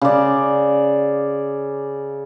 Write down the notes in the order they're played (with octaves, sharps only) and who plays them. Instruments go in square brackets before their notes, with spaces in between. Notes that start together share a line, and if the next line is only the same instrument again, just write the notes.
[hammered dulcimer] C#3 D5